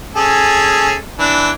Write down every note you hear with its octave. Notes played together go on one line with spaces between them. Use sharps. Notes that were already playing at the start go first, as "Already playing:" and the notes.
C#4 G#4 A4
E3 D4